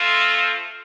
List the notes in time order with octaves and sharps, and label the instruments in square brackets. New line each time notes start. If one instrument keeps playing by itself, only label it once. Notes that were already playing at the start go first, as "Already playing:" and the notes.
Already playing: [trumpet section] A3 C4 F4